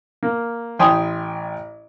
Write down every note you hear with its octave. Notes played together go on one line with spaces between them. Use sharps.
A#3
A1 G5 G#5 B5 C6 D#6